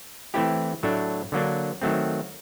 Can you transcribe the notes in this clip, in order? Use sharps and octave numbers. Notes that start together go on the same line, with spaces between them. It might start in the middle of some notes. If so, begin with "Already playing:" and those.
E3 A3 C4 E4 G4
A2 F#3 A3 D4
D3 F#3 A#3 D4
D#3 F#3 A3 C4